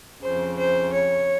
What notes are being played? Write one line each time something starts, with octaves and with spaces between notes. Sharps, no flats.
F2 C#3 C5
C5
C#5